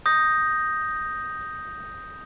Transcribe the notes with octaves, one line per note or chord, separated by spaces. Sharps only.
D#6 G6 A#6